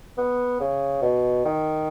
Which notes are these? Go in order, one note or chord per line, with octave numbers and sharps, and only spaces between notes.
B3
C#3
B2
D#3